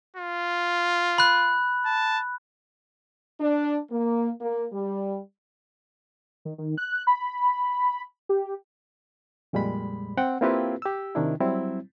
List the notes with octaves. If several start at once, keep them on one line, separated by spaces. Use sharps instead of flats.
F4
B5 F#6
A5
D4
A#3
A#3
G3
D#3
D#3
F#6
B5
G4
F2 A#2 G3 G#3 B5
C4 F#5 G5
A#3 C4 E4 F4 G4 B4
G4 E6
C3 D#3 D4 E4
F#3 G3 C4 E4